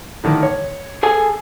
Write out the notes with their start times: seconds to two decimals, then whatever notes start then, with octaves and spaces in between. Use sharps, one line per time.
0.24 A2 D3 D#3
0.43 C#5
1.03 G#4 A4 G#5